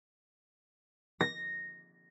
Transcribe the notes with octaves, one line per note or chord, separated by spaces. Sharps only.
A#6